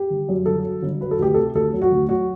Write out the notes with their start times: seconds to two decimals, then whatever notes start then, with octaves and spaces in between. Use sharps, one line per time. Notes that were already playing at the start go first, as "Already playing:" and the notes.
Already playing: G4
0.10 G1
0.29 F#2
0.46 G1 A4
0.64 F#3
0.83 G1
1.01 F#3 B4
1.11 A4
1.19 D2 G4
1.34 C3 A4
1.55 D2 A4
1.73 F#3
1.82 F#4
1.92 D2
2.09 F#3 F#4